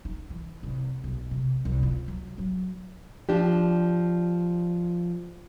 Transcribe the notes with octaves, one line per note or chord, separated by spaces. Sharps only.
D#4
E3
C2
B1
C3
C2
F4
F#3
F#3
F3 D4 G4